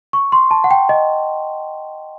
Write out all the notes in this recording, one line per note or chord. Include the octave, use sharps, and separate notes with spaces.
C#6
C6
A5
F#5
G5
D#5